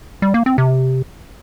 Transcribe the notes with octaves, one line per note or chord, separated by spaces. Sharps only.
G3
A#3
C4
C3